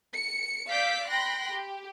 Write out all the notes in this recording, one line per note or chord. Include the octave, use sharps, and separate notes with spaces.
C#7
D5 F5 D6 E6 G6 B6
G5 B5 C6 F#6 A#6
G4